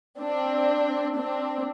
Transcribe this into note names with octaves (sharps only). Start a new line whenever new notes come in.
C4 D4
C4 D4